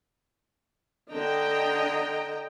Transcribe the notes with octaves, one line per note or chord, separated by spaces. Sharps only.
D3 D#5 G5 A#5